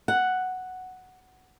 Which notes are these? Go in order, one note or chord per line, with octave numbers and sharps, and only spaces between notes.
F#5